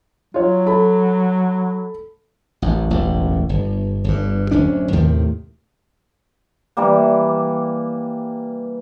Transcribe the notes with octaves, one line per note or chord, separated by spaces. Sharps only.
F#3 F4 C#5
A4 B5
A1 F#2
E1 A1 F#2
G1
G1 G2
D1 F#2 C#4 D4
D#2 A2 C3 D#3
E3 G3 A#3